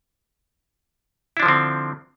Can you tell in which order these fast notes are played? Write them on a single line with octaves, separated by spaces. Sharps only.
E4 D4 F3 D3 C4